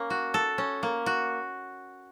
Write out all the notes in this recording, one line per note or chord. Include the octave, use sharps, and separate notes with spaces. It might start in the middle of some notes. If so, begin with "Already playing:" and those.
Already playing: A#3 C#4
F#4
A4
C#4
A#3
F#4